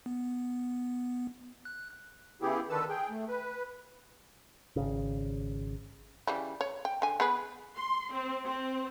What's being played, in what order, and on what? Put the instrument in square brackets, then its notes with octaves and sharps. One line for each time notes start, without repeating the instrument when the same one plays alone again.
[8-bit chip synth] B3
F#6
[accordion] C#3 B3 E4 G4 G#4
D3 D#3 A4 B4 A5 E6
G#4 G5
A3
B4
[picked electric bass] G#1 C#3
[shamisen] C#3 E3 G3
C#5
G5
D3 G#5
B3 G#4 B4
[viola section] C6
C4
C4